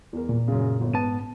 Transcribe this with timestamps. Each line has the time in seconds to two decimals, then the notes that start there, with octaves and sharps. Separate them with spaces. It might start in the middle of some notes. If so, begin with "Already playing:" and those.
0.13 E2 A#4
0.29 A#2
0.48 F#2 C#3
0.81 G1
0.93 G#2 B3 A5 D#7